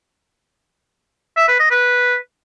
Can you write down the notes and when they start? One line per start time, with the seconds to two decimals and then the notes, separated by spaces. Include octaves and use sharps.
1.37 E5
1.48 B4
1.60 D#5
1.71 B4